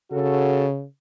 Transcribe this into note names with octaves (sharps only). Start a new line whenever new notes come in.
C#3 F#4 A4